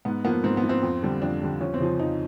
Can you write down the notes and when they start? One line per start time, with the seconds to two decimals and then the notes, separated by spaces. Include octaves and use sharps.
0.05 G#2 B3
0.25 F3 A#3 B3
0.43 G#2 C4
0.57 B3
0.63 F3 A#3
0.69 C4
0.83 F2
1.03 D3 G3
1.22 F2 D4
1.42 D3 G3
1.61 F2 C#4
1.74 C4
1.80 C#3 F3
1.99 F2 D#4